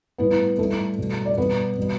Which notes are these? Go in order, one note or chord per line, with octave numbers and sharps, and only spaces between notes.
A2 G3 B3 B4
A2 G3 A3 A4
B2 G3
D5
B2 G3 B3 B4
B2 G3